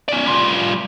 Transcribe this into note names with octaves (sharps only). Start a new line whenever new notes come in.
C#4 D5
G3 F4